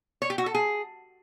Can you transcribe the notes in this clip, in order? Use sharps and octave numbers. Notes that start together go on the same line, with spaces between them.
C#5
G4
F#4
A4
G#4